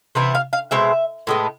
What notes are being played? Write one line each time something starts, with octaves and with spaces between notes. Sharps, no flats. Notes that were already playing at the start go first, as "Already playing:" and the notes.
C3 E3 B3 E4
F5
F5
B2 G#3 C4 E5
A2 G#3 B3